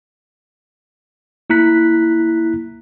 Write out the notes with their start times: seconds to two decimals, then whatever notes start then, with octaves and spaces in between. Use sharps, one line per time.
1.50 A#3 E4 A#5 F#6 B6